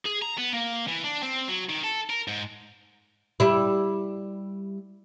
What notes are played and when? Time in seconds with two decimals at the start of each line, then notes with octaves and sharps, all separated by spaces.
0.05 G#4
0.22 A#5
0.38 B3
0.53 A#3
0.88 E3
1.04 D4
1.23 C4
1.48 F#3
1.69 D#3
1.84 A4
2.10 A#4
2.28 G#2
3.40 G3 E4